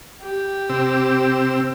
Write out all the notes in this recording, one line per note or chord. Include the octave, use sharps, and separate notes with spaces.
G4
C3 C4 E6